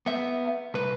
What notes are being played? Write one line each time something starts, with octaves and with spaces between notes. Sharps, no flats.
B3 E5
C2 B4